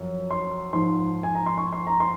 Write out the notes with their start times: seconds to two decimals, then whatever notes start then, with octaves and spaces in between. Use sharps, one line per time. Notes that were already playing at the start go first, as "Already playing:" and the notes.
Already playing: F#2 F3
0.31 C6
0.73 G#2 F3 C6
1.23 G#5
1.35 A#5
1.46 C6
1.58 C#6
1.73 C6
1.87 A#5
2.00 C6